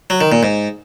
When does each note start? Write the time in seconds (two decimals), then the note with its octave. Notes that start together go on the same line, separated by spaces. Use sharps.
0.10 F#3
0.21 D#3
0.32 A#2
0.43 G#2